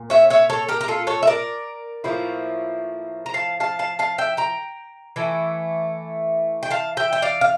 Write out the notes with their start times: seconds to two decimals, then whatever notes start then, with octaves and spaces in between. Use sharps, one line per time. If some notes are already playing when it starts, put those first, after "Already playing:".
Already playing: A#2
0.10 C#5 E5
0.30 C#5 E5
0.50 A4 C#5
0.69 G4 A#4
0.81 A#4
0.88 F4 A4
1.07 A4 C#5
1.23 E5
1.27 A#4 D5
2.04 A2 F3 A#3 E4
3.26 A#5
3.34 F5 A5
3.60 F5 A5
3.79 F5 A5
3.99 F5 A5
4.18 E5 G5
4.37 G5 A#5
5.16 E3 A3 E4
6.63 G5
6.70 F5 A5
6.97 E5 G5
7.13 G5
7.22 D5 F5
7.41 F5